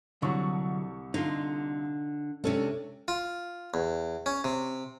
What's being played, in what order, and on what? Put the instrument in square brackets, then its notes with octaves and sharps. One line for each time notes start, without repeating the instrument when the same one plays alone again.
[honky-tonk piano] C2 C#6 [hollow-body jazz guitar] D3 F#3
[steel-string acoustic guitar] D3 [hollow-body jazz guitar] D#4 F4
[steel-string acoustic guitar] C3 C#4 D4 [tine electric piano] G#3 A4
[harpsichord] F4
E2
C#4
C3